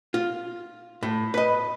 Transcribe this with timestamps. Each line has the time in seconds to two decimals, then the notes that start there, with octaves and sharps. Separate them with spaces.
0.14 F4
1.03 A2
1.34 B4 D#5